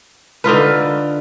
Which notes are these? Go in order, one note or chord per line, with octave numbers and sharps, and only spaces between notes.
D3 D#4 F4 B4